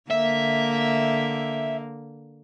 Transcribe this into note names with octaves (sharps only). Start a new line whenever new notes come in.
D3 A#3 E5